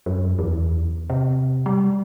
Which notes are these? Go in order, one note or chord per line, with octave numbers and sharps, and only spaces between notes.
F#2
E2
C3
G3